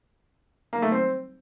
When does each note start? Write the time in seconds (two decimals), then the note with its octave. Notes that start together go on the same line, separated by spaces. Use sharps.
0.73 A#3
0.82 A3
0.92 C4